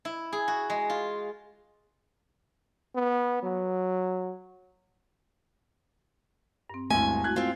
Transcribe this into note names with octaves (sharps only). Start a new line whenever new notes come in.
E4
G#4
F#4
G#3
F4
B3
F#3
G2 C4
G1 D2 G#3 C4 E4 G#5
A3 E4 F#4 F#6 G#6
C4 F4